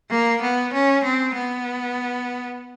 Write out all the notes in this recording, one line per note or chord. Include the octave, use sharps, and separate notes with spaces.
A#3
B3
C#4
C4
B3